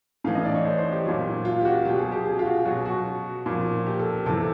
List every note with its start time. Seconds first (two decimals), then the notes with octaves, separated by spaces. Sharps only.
0.24 A2 E3 F5
0.35 D#5
0.45 D5
0.55 C#5
0.65 C5
0.78 C5
0.92 G4
1.05 A#2 F#3
1.45 F4
1.61 G4
1.65 F#4
1.85 B2 F#3 G4
1.98 G#4
2.12 G4
2.26 G#4
2.39 F4
2.46 F#4
2.65 B2 F#3 F#4
2.86 F#4
3.46 A#2 F3
3.86 G4
3.99 A4
4.13 A4
4.26 C3 E3 A4